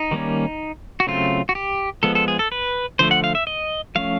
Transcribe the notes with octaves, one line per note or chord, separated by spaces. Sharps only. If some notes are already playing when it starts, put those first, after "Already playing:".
Already playing: D#4
D#3 G3 A#3 C#4
F#4
C#3 F#3 A3 C4 F4
F#4
G4
F3 G#3 B3 A4
A4
G#4
A4
B4
D3 F3 A3 C5
F#5
F5
E5
D#5
F3 A3 C#4 F5